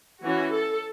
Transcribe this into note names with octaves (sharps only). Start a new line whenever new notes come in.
E3 C#4 F#4
A4